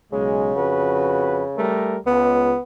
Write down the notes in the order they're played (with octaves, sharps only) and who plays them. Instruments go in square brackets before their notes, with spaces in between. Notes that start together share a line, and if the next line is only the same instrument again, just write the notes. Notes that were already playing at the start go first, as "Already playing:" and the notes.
[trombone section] B1 G#3 [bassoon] C#3
[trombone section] F2 F#4 B4
G3 A3 A#4
[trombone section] C#2 [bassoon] B3